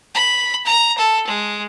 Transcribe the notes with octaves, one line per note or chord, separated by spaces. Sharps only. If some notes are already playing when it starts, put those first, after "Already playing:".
B5
A#5
A4
G#3